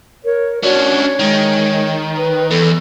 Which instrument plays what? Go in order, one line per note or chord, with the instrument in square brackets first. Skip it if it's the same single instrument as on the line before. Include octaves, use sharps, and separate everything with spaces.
[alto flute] A#4 [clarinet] C#5
[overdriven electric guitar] C#4 D4 [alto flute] F#4 [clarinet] C#5
[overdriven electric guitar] D#3 [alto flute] G#3
[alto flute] B4
[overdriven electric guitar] E2 [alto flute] A4